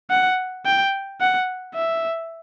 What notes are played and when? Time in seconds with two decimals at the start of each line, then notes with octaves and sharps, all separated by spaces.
0.10 F#5
0.65 G5
1.21 F#5
1.74 E5